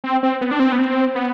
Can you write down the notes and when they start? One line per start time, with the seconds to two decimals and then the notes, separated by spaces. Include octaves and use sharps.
0.04 C4
0.23 C4
0.41 B3
0.51 D4
0.60 C4
0.72 B3
0.79 C4
1.15 B3